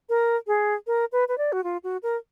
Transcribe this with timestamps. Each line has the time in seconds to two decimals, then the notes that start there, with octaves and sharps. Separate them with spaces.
0.09 A#4
0.47 G#4
0.87 A#4
1.12 B4
1.28 B4
1.38 D5
1.52 F#4
1.64 F4
1.84 F#4
2.03 A#4